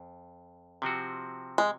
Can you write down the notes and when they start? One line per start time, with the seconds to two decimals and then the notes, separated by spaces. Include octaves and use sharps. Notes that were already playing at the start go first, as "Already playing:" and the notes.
Already playing: F2
0.82 C3 F3 C4 F#4
1.58 G#3